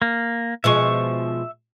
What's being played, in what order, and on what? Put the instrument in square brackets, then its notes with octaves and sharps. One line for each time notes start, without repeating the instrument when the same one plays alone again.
[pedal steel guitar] A#3
[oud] B2 F3 G#3 [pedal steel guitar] E5 C#6